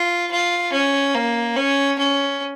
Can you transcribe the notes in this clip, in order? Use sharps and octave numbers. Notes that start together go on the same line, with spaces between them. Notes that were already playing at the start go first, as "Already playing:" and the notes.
Already playing: F4
F4
C#4
A#3
C#4
C#4